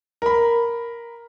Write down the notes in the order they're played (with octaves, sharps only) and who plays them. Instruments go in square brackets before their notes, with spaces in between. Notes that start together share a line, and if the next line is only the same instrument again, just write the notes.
[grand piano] A#4 B5